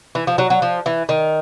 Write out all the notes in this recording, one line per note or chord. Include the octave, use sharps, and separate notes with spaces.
E3
F3
F#3
F#3
F3
E3
D#3